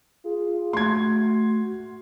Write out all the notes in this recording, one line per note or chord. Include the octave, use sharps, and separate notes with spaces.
F4 G#4
A3 F#4 C6 G#6